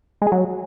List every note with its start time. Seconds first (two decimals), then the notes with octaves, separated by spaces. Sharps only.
0.22 G#3
0.27 G#4
0.32 F#3